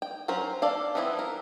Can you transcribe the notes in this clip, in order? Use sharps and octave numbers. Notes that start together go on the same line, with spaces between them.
G5
F#3 C#4 A#4 C5
A4 D5 F5
E3 F3 B3 C4 E4
A#4